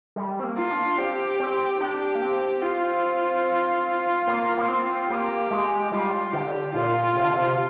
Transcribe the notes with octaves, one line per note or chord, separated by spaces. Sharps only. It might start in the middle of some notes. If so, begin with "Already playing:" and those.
G3
C4
A#3
F4
D4
C4 G4
C4
D4 G4
A#3
C4
F4
A#3
A#3
C4
A#3 G4
G#3
G3 F4
D3 G4
A#2 F4
C3
D3
C3